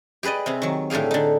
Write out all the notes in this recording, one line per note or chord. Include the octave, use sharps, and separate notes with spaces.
G4 G#4 B4 D5 D#5
C3 C4 G#4
D#3 F#3
A2 D3 G4 G#4 F5
D3 D#4